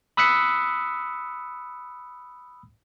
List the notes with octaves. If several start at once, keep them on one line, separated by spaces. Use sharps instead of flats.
B5 D#6 E6 F#6 B6 C#7